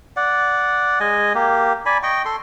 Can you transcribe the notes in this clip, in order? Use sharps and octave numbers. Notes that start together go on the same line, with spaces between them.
D5 F#5
G#3 D#5 G#5
A#3 G4
D5 G#5 B5
D#5 G5 C#6
A4 C6